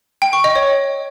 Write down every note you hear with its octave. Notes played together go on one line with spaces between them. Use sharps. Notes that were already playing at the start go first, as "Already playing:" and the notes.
G5
C#6
D#5
C#5